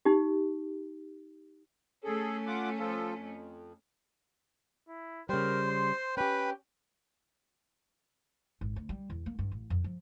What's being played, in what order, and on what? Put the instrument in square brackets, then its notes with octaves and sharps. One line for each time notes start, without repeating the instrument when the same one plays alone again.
[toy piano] D#4 G4
[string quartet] A3 C#4 [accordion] G#4 A4
[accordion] F4 F#5 D6
F3 F4 A4
F2
[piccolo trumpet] E4
[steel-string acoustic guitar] C#3 G3 [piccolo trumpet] A#4 [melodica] C5
[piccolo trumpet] C6
[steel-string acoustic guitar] C#4 G4 [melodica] B4 [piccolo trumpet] G5
[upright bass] G#1
D2
G3
E2
A#3
G2
A1
F2
F3